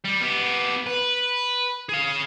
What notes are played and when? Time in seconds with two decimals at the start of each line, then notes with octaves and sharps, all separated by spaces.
0.04 G3
0.21 B3 G4
0.87 B4
1.89 G#4 F5